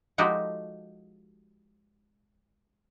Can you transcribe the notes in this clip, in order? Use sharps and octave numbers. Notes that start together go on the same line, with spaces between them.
F3 G#3 D#4 F#4 G4 A4